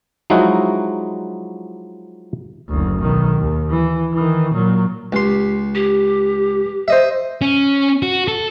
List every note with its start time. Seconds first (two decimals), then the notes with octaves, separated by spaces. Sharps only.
0.30 F3 F#3 G#3 D#4 E4 F#4
2.69 F#1 D2
3.00 B1 D#3
3.40 D#2
3.71 E3
4.13 D#3 E3
4.53 A#2 F#3
5.12 C#2 G4 C6
5.75 G4
6.88 C5 D#5 E5
7.41 C#4
8.03 F#4
8.28 A4